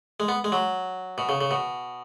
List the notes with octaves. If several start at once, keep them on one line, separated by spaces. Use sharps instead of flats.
G#3
B3
G#3
F#3
B2
C#3
C#3
B2